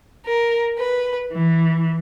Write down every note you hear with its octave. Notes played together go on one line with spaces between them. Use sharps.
A#4
B4
E3